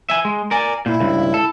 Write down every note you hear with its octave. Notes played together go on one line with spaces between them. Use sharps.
E5 G#5
G#3
A#4 D5 G#5
A#2 E4
C#2 G2
A4